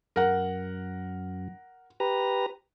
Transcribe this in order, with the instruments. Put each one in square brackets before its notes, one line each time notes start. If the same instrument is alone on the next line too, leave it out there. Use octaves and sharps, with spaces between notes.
[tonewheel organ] F#2 [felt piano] A#4 F#5
[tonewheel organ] G4 B4 A#5